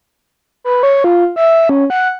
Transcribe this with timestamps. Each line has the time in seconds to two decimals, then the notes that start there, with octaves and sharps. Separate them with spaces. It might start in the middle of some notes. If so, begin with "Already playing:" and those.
0.64 B4
0.83 C#5
1.04 F4
1.36 E5
1.69 C#4
1.90 F#5